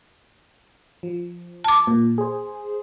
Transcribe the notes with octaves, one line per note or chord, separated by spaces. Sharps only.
F3
A5 D6
A#2
G#4 C5